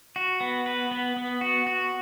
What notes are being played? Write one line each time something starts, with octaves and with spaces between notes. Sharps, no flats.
F#4
B3
B4
B3
B3
F#4
F#4